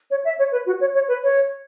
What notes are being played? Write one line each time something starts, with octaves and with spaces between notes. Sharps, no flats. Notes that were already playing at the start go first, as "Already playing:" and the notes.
C#5
E5
C#5
B4
F#4
C#5
C#5
B4
C#5